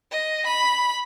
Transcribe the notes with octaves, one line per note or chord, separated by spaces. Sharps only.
D#5
B5